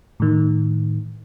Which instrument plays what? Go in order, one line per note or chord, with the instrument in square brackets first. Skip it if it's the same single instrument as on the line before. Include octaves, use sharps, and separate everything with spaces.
[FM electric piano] A2 D#3